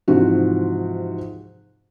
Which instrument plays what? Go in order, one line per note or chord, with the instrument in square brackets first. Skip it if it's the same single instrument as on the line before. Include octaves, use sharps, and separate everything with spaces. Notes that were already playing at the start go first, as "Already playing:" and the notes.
[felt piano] G#2 C3 E3 F3 F#4